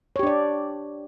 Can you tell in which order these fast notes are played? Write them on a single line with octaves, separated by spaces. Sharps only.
C#5 G4 D4 D5